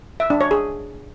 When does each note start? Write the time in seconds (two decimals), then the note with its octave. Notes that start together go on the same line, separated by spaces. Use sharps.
0.20 E5
0.30 D4
0.41 C#5
0.51 G#4